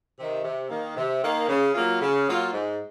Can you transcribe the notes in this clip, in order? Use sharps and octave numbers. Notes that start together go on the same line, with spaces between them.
C3 D#3
C3
D#3 A#3
C3
D#3 A#3
C#3
F#3 A#3 F4
C#3
F#3 A#3 F4
G#2